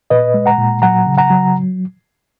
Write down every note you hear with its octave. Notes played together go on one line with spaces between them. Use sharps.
A#2 B4 D#5
G#3
F#5 A#5
A#2
F#3 F#5 A#5
C#3
F#5 A#5
F#3